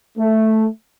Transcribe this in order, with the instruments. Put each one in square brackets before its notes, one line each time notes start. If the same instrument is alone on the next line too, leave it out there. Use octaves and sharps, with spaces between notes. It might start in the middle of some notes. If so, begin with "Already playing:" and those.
[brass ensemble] A3